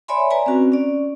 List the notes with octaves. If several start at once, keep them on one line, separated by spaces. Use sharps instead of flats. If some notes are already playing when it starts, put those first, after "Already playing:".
C#5 D5 E5 G#5 B5 C6
B4 D5 G#5 A#5
C4 C#4 F#4
C#4 D5